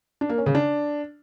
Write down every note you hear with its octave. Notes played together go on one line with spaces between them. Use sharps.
D4
A#3
C#4
C#3
D4